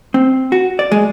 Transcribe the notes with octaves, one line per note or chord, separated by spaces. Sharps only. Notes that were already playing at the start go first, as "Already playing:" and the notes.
C4
F#4
D5
G#3